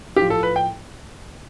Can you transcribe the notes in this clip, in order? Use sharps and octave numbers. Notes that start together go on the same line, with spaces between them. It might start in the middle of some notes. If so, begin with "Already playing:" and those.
A2 F3 G4
A4
B4
G5